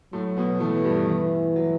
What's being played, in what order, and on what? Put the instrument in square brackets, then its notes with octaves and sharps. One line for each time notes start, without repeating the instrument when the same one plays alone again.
[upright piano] A2 A3 [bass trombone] F#3
[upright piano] B2 B3
[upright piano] A2 A3 [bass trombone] E3
[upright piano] G2 G3
[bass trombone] E3
[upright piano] F#3